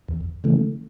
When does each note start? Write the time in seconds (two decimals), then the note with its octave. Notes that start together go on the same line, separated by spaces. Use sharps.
0.08 E2
0.44 C#3 E3 A3